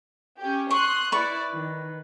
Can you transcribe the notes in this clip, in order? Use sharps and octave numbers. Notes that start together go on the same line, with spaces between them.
C#4 G4
C6 C#6 D#6 F#6
E4 B4 D5 C#6
D#3